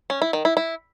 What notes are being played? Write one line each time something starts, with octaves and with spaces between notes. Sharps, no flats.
C#4
E4
D#3
E4
E4